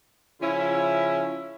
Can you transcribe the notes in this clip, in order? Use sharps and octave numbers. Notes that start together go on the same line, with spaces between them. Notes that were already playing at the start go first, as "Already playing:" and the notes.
C#3 F3 C#4 E4